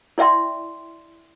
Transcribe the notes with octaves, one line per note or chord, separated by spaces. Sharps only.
E4 D5 E5 G5 C6